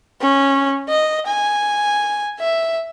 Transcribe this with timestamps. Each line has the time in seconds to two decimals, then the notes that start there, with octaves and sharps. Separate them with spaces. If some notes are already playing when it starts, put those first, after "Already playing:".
0.21 C#4
0.89 D#5
1.26 G#5
2.40 E5